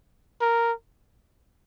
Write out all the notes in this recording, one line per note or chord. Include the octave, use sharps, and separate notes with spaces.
A#4